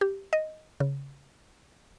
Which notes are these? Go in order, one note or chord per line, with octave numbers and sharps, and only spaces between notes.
G4
D#5
C#3